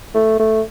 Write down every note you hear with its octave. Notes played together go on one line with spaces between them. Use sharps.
A3
A3